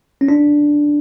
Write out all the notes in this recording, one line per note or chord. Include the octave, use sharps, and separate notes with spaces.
C#4
D4